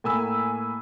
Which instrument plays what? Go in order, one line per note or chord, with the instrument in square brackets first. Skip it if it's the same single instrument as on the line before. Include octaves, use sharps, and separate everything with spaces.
[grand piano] A2 A#3 G#5 B5 E6